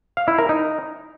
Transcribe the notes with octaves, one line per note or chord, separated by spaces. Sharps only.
F5
E4
A#4
D#4